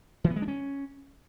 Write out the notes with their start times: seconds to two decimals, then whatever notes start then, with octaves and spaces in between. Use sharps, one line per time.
0.24 E3
0.30 B3
0.36 G#3
0.42 D4
0.48 C#4